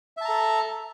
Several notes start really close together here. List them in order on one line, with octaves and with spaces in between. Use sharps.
E5 A5 A#5 A4